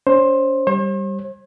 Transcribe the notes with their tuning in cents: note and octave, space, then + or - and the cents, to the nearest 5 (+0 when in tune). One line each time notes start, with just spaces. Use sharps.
C#4 +40 C5 +15
G3 +0 C5 +45